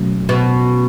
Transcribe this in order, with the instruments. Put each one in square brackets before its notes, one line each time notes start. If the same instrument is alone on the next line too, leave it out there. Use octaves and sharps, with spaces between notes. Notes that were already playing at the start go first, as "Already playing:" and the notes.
Already playing: [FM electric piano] B2 F#3 A3 C#4
[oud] B2